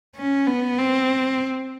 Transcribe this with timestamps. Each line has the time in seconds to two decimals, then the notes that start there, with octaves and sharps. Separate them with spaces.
0.16 C#4
0.46 B3
0.78 C4